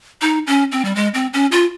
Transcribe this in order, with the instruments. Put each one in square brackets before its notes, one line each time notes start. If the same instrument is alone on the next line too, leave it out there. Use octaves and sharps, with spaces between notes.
[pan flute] D#4
C#4
C4
G3
G#3
C4
C#4
F4